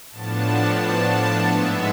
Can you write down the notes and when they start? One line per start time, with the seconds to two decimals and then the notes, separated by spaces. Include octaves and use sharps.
0.11 A2 F3 B3 D4 A5
0.80 A5
1.49 G#2 G#3 B3 E5